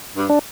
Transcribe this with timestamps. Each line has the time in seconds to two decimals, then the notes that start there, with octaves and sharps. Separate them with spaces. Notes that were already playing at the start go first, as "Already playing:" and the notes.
0.16 G2
0.30 D4